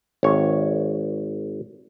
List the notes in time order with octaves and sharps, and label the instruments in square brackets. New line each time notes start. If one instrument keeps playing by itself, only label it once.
[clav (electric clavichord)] G#1 C#5